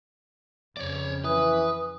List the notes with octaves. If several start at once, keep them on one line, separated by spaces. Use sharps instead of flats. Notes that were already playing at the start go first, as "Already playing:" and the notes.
F2 C#3 C#5 D5
E3 B4 D#6